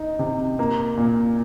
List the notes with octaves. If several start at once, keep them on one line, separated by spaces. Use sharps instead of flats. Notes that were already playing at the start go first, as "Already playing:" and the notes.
Already playing: D#4
C3
A#3
A#2